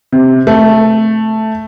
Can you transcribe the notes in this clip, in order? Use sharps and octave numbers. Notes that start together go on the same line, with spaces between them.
C3
A3